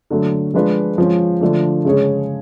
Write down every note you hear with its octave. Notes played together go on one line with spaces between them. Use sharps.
D3 F#3 A3
F3 G#3 D4 F4 B4
F3 G#3 C#4
D3 F3 A3 D4
C#3 G#3 C#4 G#4 C#5